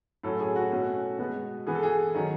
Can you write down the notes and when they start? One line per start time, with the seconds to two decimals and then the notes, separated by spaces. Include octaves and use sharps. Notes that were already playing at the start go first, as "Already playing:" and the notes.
0.23 A2 F#3 C#4 A4
0.40 G#4
0.56 F#4
0.72 B2 A3 C#4
1.19 B2 G#3 B3
1.67 E3 B3 G#4
1.75 A4
1.83 G#4
2.15 D#3 F#3 C#4